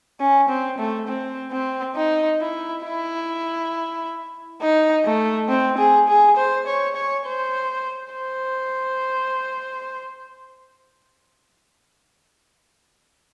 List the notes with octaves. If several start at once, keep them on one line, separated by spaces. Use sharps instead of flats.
C#4
C4
A3
C4
C4
D#4
E4
E4
D#4
A3
C4
G#4
G#4
C5
C#5
C#5
C5
C5